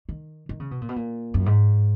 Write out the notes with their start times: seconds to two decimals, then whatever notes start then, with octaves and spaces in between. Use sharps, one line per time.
0.09 D#3
0.49 D#3
0.60 C#3
0.71 B2
0.81 A#2
0.89 B2
0.96 A#2
1.34 F#2
1.46 G#2